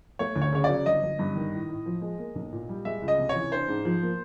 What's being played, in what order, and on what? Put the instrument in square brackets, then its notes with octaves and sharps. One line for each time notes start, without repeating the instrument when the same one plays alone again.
[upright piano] A3 [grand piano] C#5
[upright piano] D2
[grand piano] C#5
[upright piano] C#3 [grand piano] C#5
[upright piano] F#3 [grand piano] D5
[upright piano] G1 [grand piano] D#5
[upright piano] G1
G2
D#3
A2
A2
F3
G#3
A#3
B1
A#2
G3
[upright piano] G#3 [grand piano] E5
[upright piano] C#2
[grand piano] D#5
[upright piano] C3
[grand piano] C#5
[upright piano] E3
[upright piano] D4 [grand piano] C5
[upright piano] G#2
F3
A#3